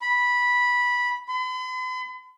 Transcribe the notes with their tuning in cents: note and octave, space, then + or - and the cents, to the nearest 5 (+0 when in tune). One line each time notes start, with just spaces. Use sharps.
B5 -10
B5 +45